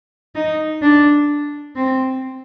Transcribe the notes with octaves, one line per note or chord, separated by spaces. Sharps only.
D#4
D4
C4